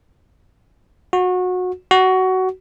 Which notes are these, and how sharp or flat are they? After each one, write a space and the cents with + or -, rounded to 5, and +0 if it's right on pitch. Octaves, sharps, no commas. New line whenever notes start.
F#4 -25
F#4 +15